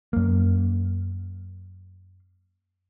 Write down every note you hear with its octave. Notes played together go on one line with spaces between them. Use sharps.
F#2 A#3